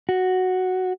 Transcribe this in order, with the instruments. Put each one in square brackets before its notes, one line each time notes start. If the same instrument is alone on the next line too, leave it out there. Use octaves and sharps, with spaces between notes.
[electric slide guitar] F#4